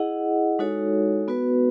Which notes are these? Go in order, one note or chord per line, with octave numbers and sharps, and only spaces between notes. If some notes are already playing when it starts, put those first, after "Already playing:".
Already playing: E4 G#4 D#5 F#5
G#3 D#4 F#4 A4 C#5
B3 F#4 B4